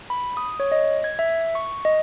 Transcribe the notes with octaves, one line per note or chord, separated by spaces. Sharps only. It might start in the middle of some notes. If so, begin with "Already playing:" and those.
B5
D#6
C#5
D#5
G#6
E5
C#6
D#5